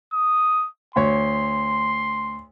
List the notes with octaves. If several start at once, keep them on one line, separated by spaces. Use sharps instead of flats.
D#6
D2 C#5 C6